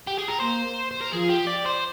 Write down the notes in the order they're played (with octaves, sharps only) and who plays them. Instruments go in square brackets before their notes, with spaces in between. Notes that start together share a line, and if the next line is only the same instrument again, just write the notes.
[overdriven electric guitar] G4
G#4
A#4
[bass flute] A#3 [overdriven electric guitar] C5
[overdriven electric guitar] C5
A#4
[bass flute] F3 [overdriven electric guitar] G#4
[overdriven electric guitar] G4
D5
C5